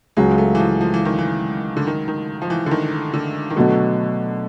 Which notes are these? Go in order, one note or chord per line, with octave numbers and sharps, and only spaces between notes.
C#2 C#3 F#3 G#3
A3
E3
F3
F3
E3
D#3
E3
D3
D#3
D#3
F3
E3
D3
D#3
D3
D#3
B2 D3 F#3 A3